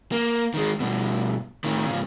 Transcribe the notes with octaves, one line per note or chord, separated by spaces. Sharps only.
A#3
D#3 G#3
G2 B2
A2 D#3
G#2 C#3